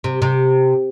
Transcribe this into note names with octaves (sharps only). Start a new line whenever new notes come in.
C3
C3